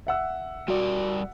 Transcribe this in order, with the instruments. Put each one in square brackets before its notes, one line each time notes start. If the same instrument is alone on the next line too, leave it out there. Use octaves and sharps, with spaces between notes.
[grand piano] E5 F#5 E6
[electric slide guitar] G3 A#4 D5 [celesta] F#4